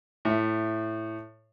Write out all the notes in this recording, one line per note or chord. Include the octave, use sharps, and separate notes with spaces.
A2 E5